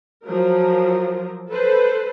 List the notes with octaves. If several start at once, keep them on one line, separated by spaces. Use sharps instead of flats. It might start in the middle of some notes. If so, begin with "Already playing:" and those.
F3 F#3 A#4
A4 B4 C5